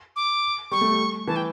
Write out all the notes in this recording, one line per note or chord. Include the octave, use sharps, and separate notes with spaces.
D6
G3 C#6
A3
G3
E3 A5
G5